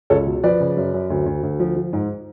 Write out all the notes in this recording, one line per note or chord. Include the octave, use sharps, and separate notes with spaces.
C#2 A4 C#5
B2
F3 B4 D5
C#3
F#2
F#2
D2
D2
D2
F3
F3
G#2